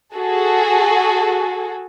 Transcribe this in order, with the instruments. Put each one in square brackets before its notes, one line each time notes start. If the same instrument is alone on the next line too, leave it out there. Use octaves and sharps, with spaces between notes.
[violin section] F#4 G#4 A4